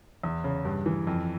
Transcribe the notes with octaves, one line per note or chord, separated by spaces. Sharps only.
E2
C#3
G2
E3
F2